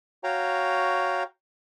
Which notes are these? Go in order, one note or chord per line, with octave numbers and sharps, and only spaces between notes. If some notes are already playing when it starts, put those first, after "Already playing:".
F#4 C#5 F5 G5 A#5